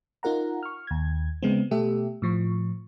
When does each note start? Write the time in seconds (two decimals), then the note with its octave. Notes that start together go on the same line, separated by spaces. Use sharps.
0.23 D#4 F4 A#4 F#5 A#5
0.63 C#6 F6
0.87 D#2 G#6
1.42 C#3 G#3 B3 C4
1.71 B2 A3 G4 A4 E5
2.22 A2 F3 C#6